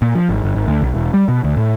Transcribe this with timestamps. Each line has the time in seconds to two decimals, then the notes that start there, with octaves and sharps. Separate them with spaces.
0.02 A#2
0.15 F3
0.29 G#1
0.44 G1
0.55 G#1
0.68 D2
0.82 B1
0.95 E1
1.14 G3
1.28 B2
1.44 D2
1.57 A2